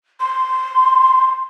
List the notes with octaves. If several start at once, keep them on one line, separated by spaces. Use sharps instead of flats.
C6